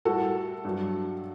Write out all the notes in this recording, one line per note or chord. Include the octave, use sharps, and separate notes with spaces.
A2 G3 F#4 A4
G2 F#3